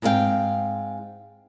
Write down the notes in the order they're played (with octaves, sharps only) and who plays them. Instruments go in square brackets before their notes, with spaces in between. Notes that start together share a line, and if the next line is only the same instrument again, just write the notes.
[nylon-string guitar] G#2 B3 C4 E4 F5 G5